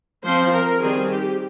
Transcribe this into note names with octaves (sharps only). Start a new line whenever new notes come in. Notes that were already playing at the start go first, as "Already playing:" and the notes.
F3 C4 C5
A#4
D#3 G3 C4 G#4
G4